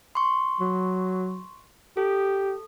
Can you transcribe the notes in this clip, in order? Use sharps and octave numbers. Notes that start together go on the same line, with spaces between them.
C6 C#6
F#3
G4 A4